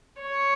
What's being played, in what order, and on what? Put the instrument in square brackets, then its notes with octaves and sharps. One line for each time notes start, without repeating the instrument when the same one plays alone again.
[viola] C#5